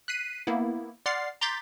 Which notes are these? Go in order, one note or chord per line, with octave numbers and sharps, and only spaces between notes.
F#6 B6 C7 D#7
A#3 B3 E4
D5 F#5 C6 F6 A6 C7
A#5 C6 D6 G6 A6 B6